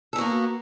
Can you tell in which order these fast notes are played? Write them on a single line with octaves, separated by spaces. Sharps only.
A4 B3 F#4 A#3